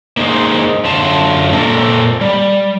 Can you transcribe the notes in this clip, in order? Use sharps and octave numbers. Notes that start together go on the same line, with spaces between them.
A#3 D#4 G#4 C5
F#2 D3 F4 A5
A#2 A#3 C4 E4 A4 A#4
G3